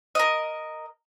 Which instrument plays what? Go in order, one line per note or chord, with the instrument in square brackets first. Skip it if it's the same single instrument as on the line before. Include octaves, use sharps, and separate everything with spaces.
[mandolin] A#4 D#5